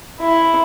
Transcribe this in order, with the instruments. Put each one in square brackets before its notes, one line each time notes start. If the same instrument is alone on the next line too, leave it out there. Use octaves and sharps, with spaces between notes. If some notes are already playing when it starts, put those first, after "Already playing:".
[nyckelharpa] E4